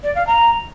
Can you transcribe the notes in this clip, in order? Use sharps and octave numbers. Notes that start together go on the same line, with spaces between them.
D5
F5
A#5